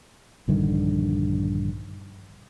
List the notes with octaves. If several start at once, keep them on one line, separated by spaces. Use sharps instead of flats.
A#1 G2 D3 D#3